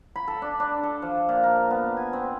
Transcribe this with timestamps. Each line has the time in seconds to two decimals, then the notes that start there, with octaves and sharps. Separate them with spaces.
0.16 B5
0.28 A4
0.42 D4
0.60 D4
0.83 A4
1.02 F3
1.29 A#2
1.43 A#4
1.70 B3
1.97 G#5
2.13 C4